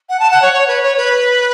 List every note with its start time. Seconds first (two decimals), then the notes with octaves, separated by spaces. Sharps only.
0.09 F#5
0.19 A5
0.31 F#5
0.42 C#5
0.53 C#5
0.68 B4
0.82 C#5
0.97 B4